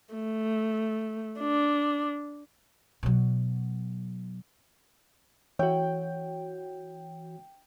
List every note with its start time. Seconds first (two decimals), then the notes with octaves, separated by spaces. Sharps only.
0.14 A3
1.41 D4
3.03 B2 F#3
5.59 E3 F#4 C#5 G5